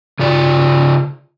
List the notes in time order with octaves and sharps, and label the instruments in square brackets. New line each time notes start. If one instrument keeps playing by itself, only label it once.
[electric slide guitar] C#3 F4 D5